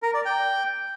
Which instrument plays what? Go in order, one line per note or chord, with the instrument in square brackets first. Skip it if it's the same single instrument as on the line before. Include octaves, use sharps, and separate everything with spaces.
[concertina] A#4
D5
G5